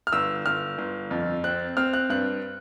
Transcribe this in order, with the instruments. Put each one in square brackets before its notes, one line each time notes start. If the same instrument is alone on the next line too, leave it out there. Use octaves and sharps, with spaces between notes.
[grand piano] F6
G1 E6
G1 F6
G1
F2
C4 F#6
C4 F6
F#6
G2 F#6